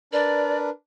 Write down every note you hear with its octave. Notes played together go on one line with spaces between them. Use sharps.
D4 A#4 B4 D5